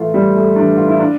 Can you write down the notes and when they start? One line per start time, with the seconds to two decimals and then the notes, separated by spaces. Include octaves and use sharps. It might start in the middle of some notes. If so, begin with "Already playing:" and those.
Already playing: A2 E3 A3 F4
0.14 A2 G3
0.36 A3
0.56 E3 D4
0.77 F4
0.88 E4
0.99 D4